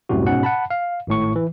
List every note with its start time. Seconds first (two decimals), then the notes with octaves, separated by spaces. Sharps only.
0.09 C2 F#2 A2 C3 F#4
0.26 G#2 B2 C#4 F#5
0.43 F#5 A5 B5
0.70 F5
1.07 G#1 A2 C#6
1.36 E3